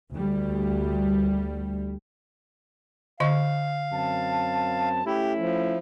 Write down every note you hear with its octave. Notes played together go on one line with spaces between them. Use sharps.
D2 G3
D3 D#5 F5 C#6
F#2 C4 A5
A3 C#4 E4 G4
F3